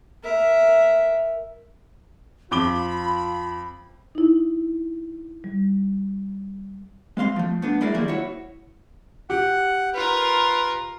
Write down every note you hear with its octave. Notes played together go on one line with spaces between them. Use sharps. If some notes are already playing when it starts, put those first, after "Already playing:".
A#4 E5
F2 F4 B5 D6 G7
D#4 E4
G3
G#3 C4 F5 C6
F3 A3
A3 B3 D4
G#3 A3 E4 G#4 A#4 D5
D#3 F3 G3 G#3 A#3 E4
E4 F#4 C#5
G4 F#5
F4 A#4 B4